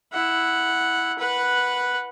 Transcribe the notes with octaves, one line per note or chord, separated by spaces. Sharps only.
E4 F#5
B4 F#5